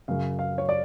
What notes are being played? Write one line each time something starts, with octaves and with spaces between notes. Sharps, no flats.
F#2 C#3 F5
F5
C#5
D5